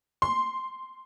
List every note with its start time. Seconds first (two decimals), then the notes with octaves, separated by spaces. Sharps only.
0.22 C6